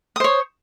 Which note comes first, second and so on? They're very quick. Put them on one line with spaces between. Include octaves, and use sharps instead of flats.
D#6 C5 C#5